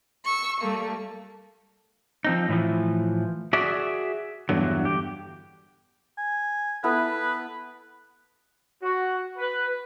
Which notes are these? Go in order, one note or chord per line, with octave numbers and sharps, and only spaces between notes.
C#6 E6
G3 A3 A#3
F3 C4 D#4
A2 E3 F3
F#4 G#4 D5 E5
E2 G2 D3 F#3
G4
G#5
B3 E4 A4 B4
F#4
B4